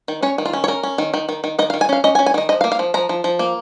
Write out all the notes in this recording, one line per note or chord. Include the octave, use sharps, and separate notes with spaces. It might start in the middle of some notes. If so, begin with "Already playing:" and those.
D#3
C#4 C#5
D#3
F4
C#4
C#5
C#4 A#4
C#4
D#3
D#3
D#3
D#3
D#3 D#5
F5
D#3
G#5
C#4 F5
C#4 D#5
G#5
C#4
G#5
D#3 D#5
F3 D#5
F5
A#3
F5
F3
F3 A#5
F3
F3
A#3